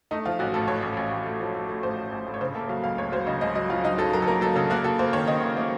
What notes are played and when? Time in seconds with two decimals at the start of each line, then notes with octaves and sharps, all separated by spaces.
0.11 A3 D#4
0.25 F3 F4
0.39 A1 F#4
0.54 A2 A4
0.67 A2 C#5
0.82 A1
0.97 A1
1.11 A1
1.25 A3
1.40 F3
1.54 A3
1.69 A3
1.83 A2 C5
1.97 A3
2.12 A1
2.26 A2
2.34 C#5
2.41 C#3 C5
2.55 A#3 A4
2.69 F#3 F5
2.84 C#2 F5
2.98 C#2 C#5
3.12 F#3 C5
3.27 C#3 D#5
3.41 C#2 D#5
3.55 F#3 D#5
3.70 F#3 F4
3.84 F#3 D#4
3.98 F#3 A4
4.13 F#3 A#4
4.22 A4
4.27 A#3 A#4
4.41 F#3 A4
4.56 C#3 A4
4.70 A#3 F#4
4.84 A#3 A4
4.99 A#3 C5
5.13 D#3 C#5
5.27 D#3 D#5
5.42 A#3
5.57 A#3